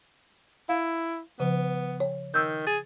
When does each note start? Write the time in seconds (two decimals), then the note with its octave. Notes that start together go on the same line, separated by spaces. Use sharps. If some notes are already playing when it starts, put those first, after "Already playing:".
0.69 E4 F5
1.40 C#3 F3 B3
2.00 C#5
2.34 D#3 E6 G6
2.67 G#4 A6